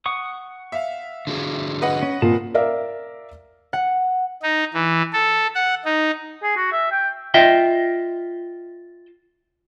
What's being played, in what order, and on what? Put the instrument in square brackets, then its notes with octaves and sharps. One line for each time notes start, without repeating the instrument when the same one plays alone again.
[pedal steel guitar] F#5 C#6 D#6
[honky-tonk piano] E5 F5
[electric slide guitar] D3 F#4 G#4
[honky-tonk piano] B4 D#5 F#5
[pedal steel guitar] C#4
[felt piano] A#2 [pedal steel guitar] C4 A5
[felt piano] A#4 D5 E5 F5
[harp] F#5
[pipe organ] D#4
E3
A4
F#5
D#4
[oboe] G#4
F#4
E5
G5
[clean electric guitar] F4 D#5 E5 G5